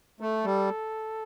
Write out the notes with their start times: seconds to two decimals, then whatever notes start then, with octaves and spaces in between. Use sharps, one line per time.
0.21 A3 A4
0.45 G3